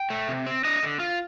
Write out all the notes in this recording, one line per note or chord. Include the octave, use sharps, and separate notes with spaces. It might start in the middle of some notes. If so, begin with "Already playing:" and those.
Already playing: G5
A3
C3
C4
D4 D#5
D3
F4